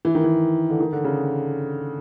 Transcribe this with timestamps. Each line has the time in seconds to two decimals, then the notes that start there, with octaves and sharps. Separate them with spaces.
0.05 E3
0.15 D#3
0.24 E3
0.70 D3
0.80 D#3
0.93 D3
1.04 C#3